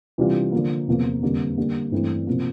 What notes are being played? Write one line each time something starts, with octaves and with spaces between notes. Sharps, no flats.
C3 E3 G3 D4 F4
D3 F3 A#3
E2 C3 F3 A#3 F4
F2 D3 G3 A#3
D3 G3 A#3
G2 E3 A3 C4 E4
C3 F3 A#3